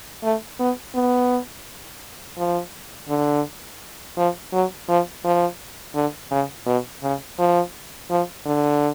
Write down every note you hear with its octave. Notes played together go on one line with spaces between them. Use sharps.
A3
B3
B3
F3
D3
F3
F#3
F3
F3
D3
C#3
B2
C#3
F3
F3
D3